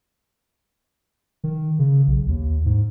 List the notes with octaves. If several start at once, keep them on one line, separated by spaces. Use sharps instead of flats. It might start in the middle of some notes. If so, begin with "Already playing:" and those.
D#3
C#3
B1
D#2
G#2